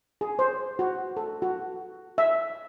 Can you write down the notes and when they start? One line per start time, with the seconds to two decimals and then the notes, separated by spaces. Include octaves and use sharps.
0.21 G#4
0.39 C5
0.79 F#4
1.17 A4
1.42 F#4
2.18 E5